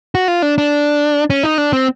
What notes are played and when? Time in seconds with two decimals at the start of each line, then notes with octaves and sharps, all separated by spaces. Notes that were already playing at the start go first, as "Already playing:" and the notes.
0.15 F#4
0.28 F4
0.42 D4
0.58 D4
1.30 C#4
1.43 D#4
1.58 D4
1.73 C4